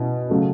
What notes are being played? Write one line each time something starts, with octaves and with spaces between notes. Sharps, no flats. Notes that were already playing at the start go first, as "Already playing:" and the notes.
Already playing: B2 C#4 E4
C#3 F#3 A3